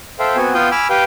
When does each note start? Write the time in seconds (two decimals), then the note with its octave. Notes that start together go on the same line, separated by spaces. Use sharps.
0.19 A4 C5 E5 F5 G5
0.36 B3 C4 F#4 G#5
0.54 B3 F4 F5 G5 D#6 G6
0.71 G#5 B5 D6 E6 F6
0.90 G4 B4 F5 G5 D6 G6